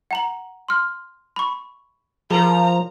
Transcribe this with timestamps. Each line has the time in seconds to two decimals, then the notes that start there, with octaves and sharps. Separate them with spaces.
0.11 F#5 A#5 F#7
0.68 C6 F6
1.36 B5 C#6
2.31 F3 G#4 A#4 A#5